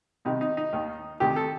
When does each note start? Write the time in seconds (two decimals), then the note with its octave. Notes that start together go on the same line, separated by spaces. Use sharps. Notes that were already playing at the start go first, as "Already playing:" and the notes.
0.25 C2 C3 D#3 D#4
0.41 D#4
0.57 D#4
0.73 D#2 D#3
1.20 D2 C3 D#3 G4
1.36 A4